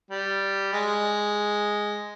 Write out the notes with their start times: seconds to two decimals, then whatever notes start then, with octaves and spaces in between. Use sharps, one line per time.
0.11 G3
0.73 G#3